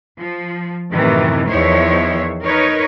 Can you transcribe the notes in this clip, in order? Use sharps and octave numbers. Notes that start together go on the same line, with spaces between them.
F3
F#2 A2 C3 D#3 E3
E2 D#3 F3 E4 C5 C#5
D#4 A#4 B4 C#5 D#5